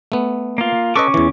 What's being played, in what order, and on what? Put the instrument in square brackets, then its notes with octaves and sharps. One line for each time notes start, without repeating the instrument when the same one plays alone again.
[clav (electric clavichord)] A3 B3
[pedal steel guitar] A#3 F4
[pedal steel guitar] C#4 C#6 D6 [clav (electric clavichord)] A4 B4 D#5
[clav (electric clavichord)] E2 E3